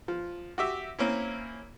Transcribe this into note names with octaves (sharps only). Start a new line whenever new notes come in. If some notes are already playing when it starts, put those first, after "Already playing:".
F3
F#4 G4 E5
A#3 C4 C#4 E4